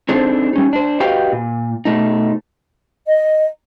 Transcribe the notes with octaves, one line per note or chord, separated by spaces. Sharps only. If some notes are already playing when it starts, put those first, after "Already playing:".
C4 D4 D#4 G#4 A4 C5
G3 C#4 D#4
D4 C5
F#4 G4 B4 D#5 F5 G5
A#2
B2 A3 D#4
D#5